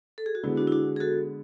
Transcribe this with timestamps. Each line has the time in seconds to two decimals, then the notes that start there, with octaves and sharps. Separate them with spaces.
0.18 A4
0.26 G#4
0.35 F#4
0.43 D3 G#3 B3 E4
0.57 D4 F#4
0.67 E4
0.72 D4 F#4
0.96 G#4
1.00 F#4 A4